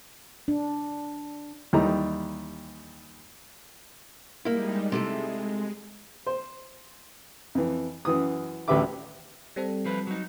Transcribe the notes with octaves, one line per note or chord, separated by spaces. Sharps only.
D4
D#2 E3 G3 D#4 A#5
G3 G#3 A#3 D#4 E4
C3 G#3 A3 E4
C5
F2 E3
F#2 E3 D#6
A1 D2 G4 B4 E5 D6
G3 C4 A4
F3 B4
F#3 D#4